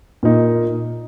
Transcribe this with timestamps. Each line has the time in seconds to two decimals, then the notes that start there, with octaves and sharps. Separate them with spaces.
0.23 A#2 A#3 D#4